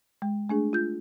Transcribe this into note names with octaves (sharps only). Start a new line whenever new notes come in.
G#3
A3 D4 G#4
F4 G6